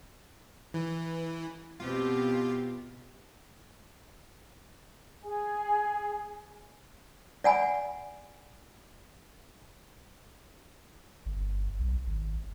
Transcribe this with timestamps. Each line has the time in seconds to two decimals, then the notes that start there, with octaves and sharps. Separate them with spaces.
0.74 E3
1.80 B2 C4 F4 G4
5.22 G#4 G#5
7.44 D5 F#5 G#5 B5
11.26 G1
11.79 B1
12.07 G#1